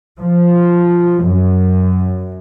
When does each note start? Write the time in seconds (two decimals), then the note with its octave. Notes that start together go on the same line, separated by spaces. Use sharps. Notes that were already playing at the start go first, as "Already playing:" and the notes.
0.19 F3
1.23 F#2